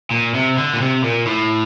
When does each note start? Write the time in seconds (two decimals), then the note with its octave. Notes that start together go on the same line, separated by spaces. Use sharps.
0.11 A#2
0.34 C3
0.57 D3
0.74 A#2
0.81 C3
1.04 A#2
1.27 A2